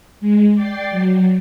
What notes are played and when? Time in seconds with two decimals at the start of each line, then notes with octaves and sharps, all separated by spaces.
0.21 G#3
0.54 D5 G5 A6 C7
0.91 F#3